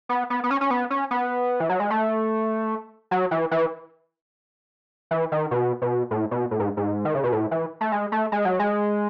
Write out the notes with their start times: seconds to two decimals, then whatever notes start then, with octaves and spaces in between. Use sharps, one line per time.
0.09 B3
0.30 B3
0.44 B3
0.51 C#4
0.61 C#4
0.71 B3
0.90 C#4
1.11 B3
1.60 E3
1.70 F#3
1.80 G#3
1.90 A3
3.11 F#3
3.31 E3
3.51 E3
5.11 E3
5.32 D#3
5.51 B2
5.82 B2
6.11 A2
6.31 B2
6.51 A2
6.60 G#2
6.77 G#2
7.05 D#3
7.15 C#3
7.24 B2
7.32 A2
7.51 E3
7.81 A3
7.92 G#3
8.12 A3
8.32 G#3
8.45 F#3
8.59 G#3